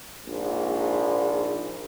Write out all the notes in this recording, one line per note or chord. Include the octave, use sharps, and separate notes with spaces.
A#1 G#2